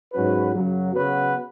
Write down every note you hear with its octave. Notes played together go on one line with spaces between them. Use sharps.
G#2 F#3 C#4 F#4 B4
F#2 C#3 F#3
C#3 F#3 B3 F#4 B4